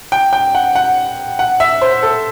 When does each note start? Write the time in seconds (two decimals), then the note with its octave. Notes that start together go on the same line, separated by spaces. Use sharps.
0.12 G5
0.33 G5
0.55 F#5
0.75 F#5
1.39 F#5
1.60 E5
1.82 C5
2.03 A4